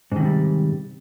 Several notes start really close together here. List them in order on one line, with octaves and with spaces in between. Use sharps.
G#2 D#3 C3 G3